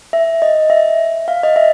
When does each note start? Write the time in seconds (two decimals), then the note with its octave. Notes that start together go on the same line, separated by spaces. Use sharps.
0.13 E5
0.42 D#5
0.70 E5
1.28 F5
1.43 D#5
1.56 E5